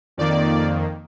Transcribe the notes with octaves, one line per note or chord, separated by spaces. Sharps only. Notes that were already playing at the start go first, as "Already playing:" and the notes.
F2 D#3 A#3 D5